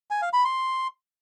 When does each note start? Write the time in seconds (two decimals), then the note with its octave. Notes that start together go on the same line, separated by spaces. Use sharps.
0.11 G#5
0.22 F5
0.33 B5
0.45 C6